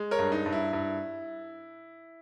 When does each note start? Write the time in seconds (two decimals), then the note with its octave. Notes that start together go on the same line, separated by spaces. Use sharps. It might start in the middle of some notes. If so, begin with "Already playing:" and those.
Already playing: G#3
0.11 A#4 C#5
0.19 G2
0.32 D#4
0.46 G2
0.52 E4
0.73 G2 E4